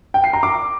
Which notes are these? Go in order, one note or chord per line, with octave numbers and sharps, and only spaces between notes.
G5
C7
A#5
D6